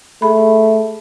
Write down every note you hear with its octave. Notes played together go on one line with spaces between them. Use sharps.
A3 G#4 B5